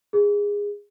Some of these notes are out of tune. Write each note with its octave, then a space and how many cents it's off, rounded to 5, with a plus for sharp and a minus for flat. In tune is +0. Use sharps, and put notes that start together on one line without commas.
G#4 -20